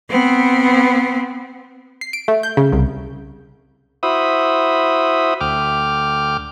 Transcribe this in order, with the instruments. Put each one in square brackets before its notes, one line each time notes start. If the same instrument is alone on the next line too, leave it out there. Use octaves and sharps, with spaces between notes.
[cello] B3 C4
[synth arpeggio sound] C7
D7
A3
G6
C#3
C2
[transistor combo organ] E4 F#4 C5 E5 B5 D#6
D2 G5 D6 F6